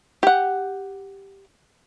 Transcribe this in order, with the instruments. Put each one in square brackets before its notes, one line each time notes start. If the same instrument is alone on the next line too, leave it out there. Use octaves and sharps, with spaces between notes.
[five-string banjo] G4 F#5